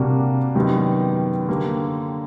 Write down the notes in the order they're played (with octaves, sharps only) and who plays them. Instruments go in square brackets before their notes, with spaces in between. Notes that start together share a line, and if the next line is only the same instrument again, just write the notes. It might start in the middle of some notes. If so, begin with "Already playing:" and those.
Already playing: [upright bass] C3 [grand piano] G3 A#3 D4 F#4
[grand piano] F#2 D#3 G3 B3
D3 G3 A#3